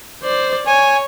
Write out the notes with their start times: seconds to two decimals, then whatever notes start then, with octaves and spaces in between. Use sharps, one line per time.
0.23 C5 D5
0.67 C#5 G#5